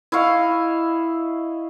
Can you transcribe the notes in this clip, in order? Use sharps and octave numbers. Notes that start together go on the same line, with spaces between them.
E4 D#5 F5 C#6